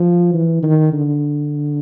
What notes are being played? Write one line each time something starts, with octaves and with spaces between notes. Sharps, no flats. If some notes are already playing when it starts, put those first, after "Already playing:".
Already playing: F3
E3
D#3
D3